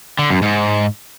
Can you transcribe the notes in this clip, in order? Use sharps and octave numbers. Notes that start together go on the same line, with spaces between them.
D3
F#2
G#2